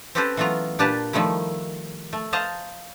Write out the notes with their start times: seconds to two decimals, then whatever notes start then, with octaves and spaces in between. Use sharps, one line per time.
0.15 C4 C#4 G4 A4 B4 C5
0.37 E3 F#3 A3 B3 F4 A#5
0.79 A#2 D4 G4 B4 A5 A#5
1.13 D#3 F3 G3 A3 E4
2.13 A3
2.33 C5 D#5 F5 A5 A#5